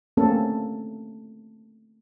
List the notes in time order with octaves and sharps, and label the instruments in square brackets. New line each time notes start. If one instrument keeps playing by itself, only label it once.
[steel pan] A3 A#3 C4 C#4 A4